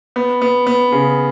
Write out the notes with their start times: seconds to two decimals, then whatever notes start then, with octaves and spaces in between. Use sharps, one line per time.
0.16 B3
0.42 B3
0.67 B3
0.92 C#3